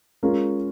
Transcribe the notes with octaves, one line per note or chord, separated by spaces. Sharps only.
G#3 C#4 F4 A#4